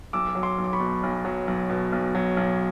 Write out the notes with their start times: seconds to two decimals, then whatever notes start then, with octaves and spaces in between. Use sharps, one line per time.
0.13 B1 D6 E6
0.35 F#3
0.43 C6 D6
0.58 B1
0.64 D6
0.73 B5 C#6
0.80 B2
1.03 B1
1.25 F#3
1.47 B1
1.70 B2
1.92 B1
2.15 F#3
2.37 B1